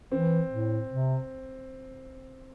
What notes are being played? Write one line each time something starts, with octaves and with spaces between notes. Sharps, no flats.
E3 C4
A2
C3